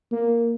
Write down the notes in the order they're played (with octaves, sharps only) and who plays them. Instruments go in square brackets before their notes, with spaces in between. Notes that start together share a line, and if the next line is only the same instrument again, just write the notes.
[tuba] A#3